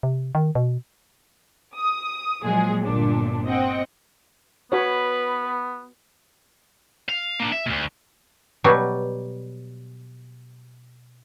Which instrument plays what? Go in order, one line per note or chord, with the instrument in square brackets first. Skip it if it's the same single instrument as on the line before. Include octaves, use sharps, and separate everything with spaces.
[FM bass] C3
D#3
B2
[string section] D#6
A#2 F3 F#3 G#3 G#4
G1 A#2 D4
C4 D#5 F#5 G5
[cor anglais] B3 [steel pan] F#4 C#5 [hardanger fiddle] B4
[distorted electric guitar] F5
A#3 D4
E5
D2 A#2
[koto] B2 F#3 G3